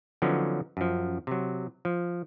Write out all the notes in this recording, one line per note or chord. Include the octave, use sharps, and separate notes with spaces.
D3 F3 F#3 B3 C#4 D#4
F#2 F3
C3 F#3
F3